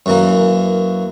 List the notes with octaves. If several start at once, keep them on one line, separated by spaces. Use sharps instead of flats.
F#2 E3 A#3